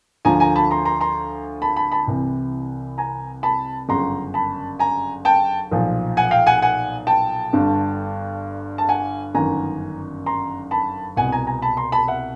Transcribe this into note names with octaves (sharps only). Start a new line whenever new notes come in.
D2 D3 F3 G#5 A#5
G#5 A#5
A5 B5
A#5 C6
A#5 C6
A#5 C6
A5 B5
A5 B5
A5 B5
C2 C3 E3
G#5 A#5
A5 B5
G1 F#2 C#3 A#5 C6
A5 B5
G#5 A#5
G5 A5
B1 A#2 F3
F#5 G#5
F5 G5
F#5 G#5
F#5 G#5
G5 A5
G1 G2 D3
A5
F#5 G#5
G1 F#2 D#3 G#5 A#5
A#5 C6
A5 B5
C2 B2 F#5 G#5
G#5 A#5
G#5 A#5
A5 B5
A#5 C6
A5 B5
E5 F#5